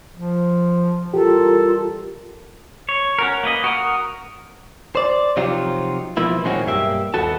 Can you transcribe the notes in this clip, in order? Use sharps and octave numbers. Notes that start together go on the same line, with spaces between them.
F3
E3 G3 F4 G4 A4 A#4
C#5
C#4 F#4 A#4
A#3 B4 D#5
F#4 A#4 D#6
C5 D5
C3 F3 F#3 D#4 F4 G4
B2 E3 F3 A#3 E4
A#2 D#3 G#3 C4 C#4 F#4
B1 G2 A#3 G4 E5
D#2 B3 F#4 A4 A5